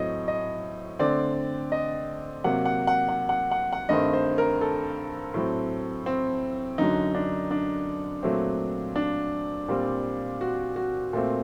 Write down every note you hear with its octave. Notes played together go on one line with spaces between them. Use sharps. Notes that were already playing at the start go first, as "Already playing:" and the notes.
Already playing: A2 F#3 C4 D#5
D#5
D3 A3 C4 D5
D#5
C3 F#3 A#3 F#5
F#5
F#5
F#5
F#5
F#5
F#5
G2 D#3 A3 C4 D#5
C5
A#4
A4
A2 F#3 C4
C4
F#2 D3 F#3 D#4
D4
D4
A#2 F#3 A3 C4
D4
A#2 G3 C4
F#4
F#4
A#2 A3 C4